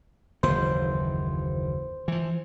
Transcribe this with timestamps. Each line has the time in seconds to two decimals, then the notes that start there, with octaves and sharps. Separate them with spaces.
0.43 F#1 D#2 E3 C5
2.08 E3 F3